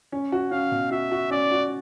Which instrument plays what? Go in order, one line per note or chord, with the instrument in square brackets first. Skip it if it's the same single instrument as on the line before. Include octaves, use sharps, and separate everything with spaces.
[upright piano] C#4
F#4
[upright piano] C#4 [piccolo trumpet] F5
[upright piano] B2
[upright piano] F#4 [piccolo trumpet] E5
[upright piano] F#4
[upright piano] C#4 [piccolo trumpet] D5
[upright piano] F#4